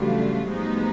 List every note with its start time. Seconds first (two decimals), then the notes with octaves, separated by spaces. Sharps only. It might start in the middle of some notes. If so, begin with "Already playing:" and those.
Already playing: C#3 E3 F#3 G3 A3 D4 F4
0.46 A2 F3 G#3 B3 D#4